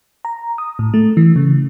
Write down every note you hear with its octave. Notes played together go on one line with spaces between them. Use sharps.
A#5
D#6
A2
A3
E3
C#3